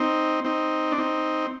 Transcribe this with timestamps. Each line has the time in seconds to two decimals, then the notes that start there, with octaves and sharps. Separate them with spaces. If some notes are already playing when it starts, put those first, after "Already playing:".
Already playing: C4 D#4
0.45 C4 D#4
0.92 D4
0.98 C4 D#4